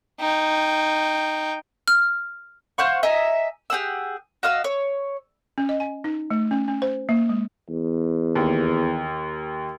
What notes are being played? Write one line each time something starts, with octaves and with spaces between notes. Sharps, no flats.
D#4 G5
F6
C5 F5 F#5 C#6
D#5 E5 G#5 A#5
G4 G#4 F#5 E6
F#4 D#5 F5 E6
C#5
C#4
D#5
G#5
D#4
A3
C#4
C#4
C5
A#3
G#3
E2
D#2